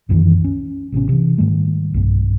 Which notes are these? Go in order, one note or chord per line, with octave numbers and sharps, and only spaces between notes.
C2 F#2 D#3 E3
C#4
A1 C3 B3 C#4
C3 E3
G#2 D#3 G3 A3
B1 G2